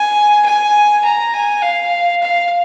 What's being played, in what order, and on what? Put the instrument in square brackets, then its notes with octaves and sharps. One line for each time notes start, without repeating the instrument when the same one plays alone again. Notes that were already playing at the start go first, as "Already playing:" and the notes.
Already playing: [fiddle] G#5
G#5
A#5
G#5
F5
F5